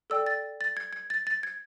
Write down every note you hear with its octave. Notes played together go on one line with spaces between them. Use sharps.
A4 D5 G5 E6
A6
A6
G#6
G#6
A6
A6
G#6